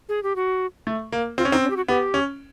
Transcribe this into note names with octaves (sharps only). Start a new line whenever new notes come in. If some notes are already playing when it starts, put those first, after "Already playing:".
G#4
G4
F#4
A3
A#3
C4 F4
C#4
C4 D#4
C#4
G4
F#4
B3 G4
C#4